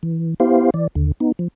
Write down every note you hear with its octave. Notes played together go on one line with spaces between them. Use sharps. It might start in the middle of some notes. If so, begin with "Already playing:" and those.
E3
B3 E4 G4 C5 F5
E3 D5
D#2 D3
B3 D#4
F3